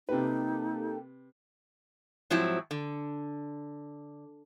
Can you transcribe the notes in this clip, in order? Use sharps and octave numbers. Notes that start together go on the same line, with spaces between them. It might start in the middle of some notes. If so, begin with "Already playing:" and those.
C3 A#3 D#4 G4 A4 B4
G#2 F3 F#3 C4 E4
D3